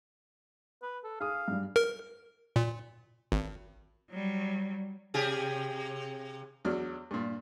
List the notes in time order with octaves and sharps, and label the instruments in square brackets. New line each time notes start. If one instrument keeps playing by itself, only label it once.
[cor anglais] B4
A4
[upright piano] G#4 D#6 [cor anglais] F5
[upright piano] G2 G3
[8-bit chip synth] A#4
A#2
G#1
[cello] F#3 G3
[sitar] C3 G4 G#4
[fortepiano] E2 F#3 D4 F6
G2 A#2